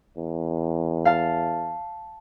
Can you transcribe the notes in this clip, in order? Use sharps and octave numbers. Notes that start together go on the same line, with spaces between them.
E2
F5 A5